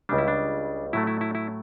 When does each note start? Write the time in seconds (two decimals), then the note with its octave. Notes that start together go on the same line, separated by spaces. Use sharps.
0.09 C#2 C#3 G3 D4
0.18 E4
0.28 D4
0.93 A2 F#3 A3 E4
1.07 E4
1.21 E4
1.35 E4